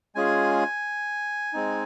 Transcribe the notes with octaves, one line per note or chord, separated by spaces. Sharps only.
G#3 C#4 F4 G#4 G#5
G#3 C4 D#4